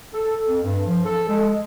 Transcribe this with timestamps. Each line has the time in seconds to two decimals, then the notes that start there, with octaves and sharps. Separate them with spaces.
0.13 A4
0.47 F2
0.64 G2
0.87 F3
1.06 A4
1.29 G#3